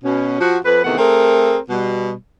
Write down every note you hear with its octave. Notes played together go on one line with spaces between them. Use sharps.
B2 C#4
F3 F#4
F2 B4
E2 C3 D#3 A3 B3 F#5
A3 C4 G#4 A#4
B2 G3